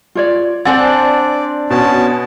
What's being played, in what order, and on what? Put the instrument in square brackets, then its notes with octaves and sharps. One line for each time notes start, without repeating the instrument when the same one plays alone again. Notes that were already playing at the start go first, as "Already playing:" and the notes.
[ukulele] F4 C#5 D5
[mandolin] C4 D4 C5 [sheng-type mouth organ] D5 [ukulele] F#5 G#5 [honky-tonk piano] A6
[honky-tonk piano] B2 [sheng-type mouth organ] C#4 F#4 A5